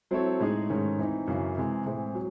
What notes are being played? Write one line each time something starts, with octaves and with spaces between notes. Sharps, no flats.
F#3 C4 E4 A4 C#5
A2 G#3 D#4 G#4
G#2 D#3 A3 C#4
E3 C4 D#4
F#2 C#3 E3
C3 E3 G#3
A2 E3 G#3 C4
F#3